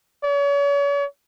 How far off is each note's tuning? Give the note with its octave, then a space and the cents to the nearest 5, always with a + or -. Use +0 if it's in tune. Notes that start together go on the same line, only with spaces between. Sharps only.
C#5 +40